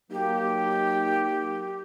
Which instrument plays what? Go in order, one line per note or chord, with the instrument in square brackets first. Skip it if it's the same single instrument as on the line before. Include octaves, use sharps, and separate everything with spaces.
[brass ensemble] F#3 A#3 D#4 [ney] G4